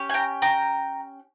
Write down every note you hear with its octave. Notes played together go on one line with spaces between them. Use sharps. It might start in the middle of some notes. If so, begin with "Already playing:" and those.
Already playing: C#4 G4
G#5
G5 A#5
G5 A#5